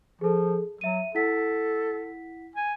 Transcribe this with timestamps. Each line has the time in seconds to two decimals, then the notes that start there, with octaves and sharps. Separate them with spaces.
0.21 F3 G#4 A4
0.81 F#3 E5 D#7
1.15 E4 A4 F#5 B6
2.56 G#5